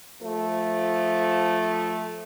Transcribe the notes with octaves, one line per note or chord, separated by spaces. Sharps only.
F3 A3